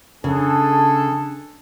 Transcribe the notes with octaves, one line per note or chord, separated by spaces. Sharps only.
C#3 D4 G#4 A4